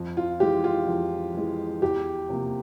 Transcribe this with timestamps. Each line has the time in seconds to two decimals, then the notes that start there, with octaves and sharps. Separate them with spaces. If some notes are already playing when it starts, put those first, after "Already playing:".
Already playing: F2
0.17 F4
0.40 E3 G#3 G4
0.64 F4
0.87 F2
1.34 E3 G#3
1.82 E2 G4
2.29 C3 F3 A#3